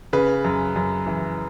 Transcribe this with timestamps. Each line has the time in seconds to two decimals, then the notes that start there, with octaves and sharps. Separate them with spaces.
0.13 C#3 B4
0.44 F#2
0.76 F#2
1.07 E3